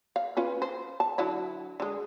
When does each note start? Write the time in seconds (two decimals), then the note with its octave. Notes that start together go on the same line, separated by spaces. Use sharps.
0.16 F5
0.37 C#4 F4 B4
0.62 C5
1.00 A5
1.18 D3 F#3 E4
1.80 D3 G#3